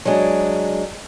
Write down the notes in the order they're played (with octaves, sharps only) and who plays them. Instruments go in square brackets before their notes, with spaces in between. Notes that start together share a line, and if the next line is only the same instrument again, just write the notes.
[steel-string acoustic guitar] F#3 G#3 D4